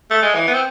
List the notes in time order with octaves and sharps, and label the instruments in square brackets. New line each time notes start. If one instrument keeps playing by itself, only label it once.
[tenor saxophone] A3
G#3
E3
B3
C4